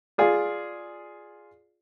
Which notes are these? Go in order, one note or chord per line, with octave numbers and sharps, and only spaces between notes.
F4 G#4 D5